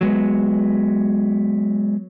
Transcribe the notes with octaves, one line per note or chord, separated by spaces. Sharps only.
F#3 G#3 B3